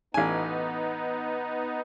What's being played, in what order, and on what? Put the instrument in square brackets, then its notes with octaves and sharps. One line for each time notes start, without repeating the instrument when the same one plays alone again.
[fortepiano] A1 G#5 [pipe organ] B3 D#4